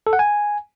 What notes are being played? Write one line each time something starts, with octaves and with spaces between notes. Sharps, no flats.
A4
F#5
G#5